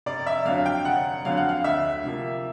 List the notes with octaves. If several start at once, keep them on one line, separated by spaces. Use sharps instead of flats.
F1 D5
E5
F2 D3 F#3 F5
G5
F1 F#5
F2 D3 F#3 F5
F#5
F5
D2 E5
C3 F3 A#3